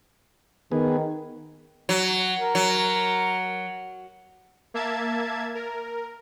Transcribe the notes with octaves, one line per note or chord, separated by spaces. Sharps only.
D#3 B3 G#4
F#3
A#4
F#3
A#3 E5 A5 G#6
A#4